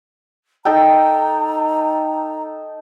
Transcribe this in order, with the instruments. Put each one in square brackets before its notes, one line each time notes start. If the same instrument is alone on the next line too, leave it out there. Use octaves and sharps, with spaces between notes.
[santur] D#4 A4 G5 [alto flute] A#5